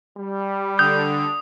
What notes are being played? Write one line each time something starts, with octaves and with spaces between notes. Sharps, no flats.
G3
D3 D#6 G6